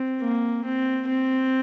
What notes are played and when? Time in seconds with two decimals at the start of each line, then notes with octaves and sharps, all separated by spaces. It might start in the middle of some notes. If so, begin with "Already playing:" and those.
Already playing: C4
0.21 A#3
0.64 C4
1.08 C4